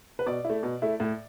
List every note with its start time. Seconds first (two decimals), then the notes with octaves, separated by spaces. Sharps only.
0.19 B4
0.26 B2 D5
0.44 E4
0.50 A3
0.63 B2
0.82 A3 E4
1.00 A2